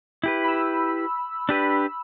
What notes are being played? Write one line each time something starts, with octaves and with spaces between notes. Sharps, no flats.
E4 G4 B4
B5 E6
D4 G4 B4